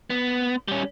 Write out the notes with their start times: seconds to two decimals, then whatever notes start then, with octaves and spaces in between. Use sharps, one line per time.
0.10 B3
0.68 G3 C#4